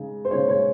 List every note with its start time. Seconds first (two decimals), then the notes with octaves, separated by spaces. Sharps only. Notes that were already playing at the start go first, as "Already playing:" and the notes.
Already playing: C#3 G#3 D#4
0.25 C5
0.30 C#3 G#3 D#4 C#5
0.48 C#5